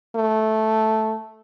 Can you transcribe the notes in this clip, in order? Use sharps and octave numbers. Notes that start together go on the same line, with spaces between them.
A3